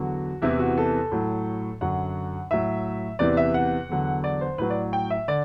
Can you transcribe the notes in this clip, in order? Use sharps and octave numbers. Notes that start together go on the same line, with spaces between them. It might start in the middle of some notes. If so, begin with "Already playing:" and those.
Already playing: E2 D3 F#3 F#4
E2 C3 E3 E4
F#4
A4
A2 F#3
F#2 D3 F#3 F#5
A2 F#3 E5
E2 C3 E3 D5
E5
F#5
E2 D3 F#3
D5
C5
A2 F#3 B4
D5
G5
E5
D3 D5